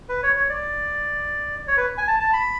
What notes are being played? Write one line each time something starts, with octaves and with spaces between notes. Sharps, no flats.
B4
C#5
C#5
D5
C#5
B4
G#5
A5
A5
B5